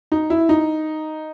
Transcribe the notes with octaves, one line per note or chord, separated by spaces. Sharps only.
D#4
E4
D#4